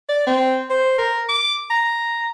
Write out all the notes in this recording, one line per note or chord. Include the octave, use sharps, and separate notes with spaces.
D5
C4
C5
A#4
D6
A#5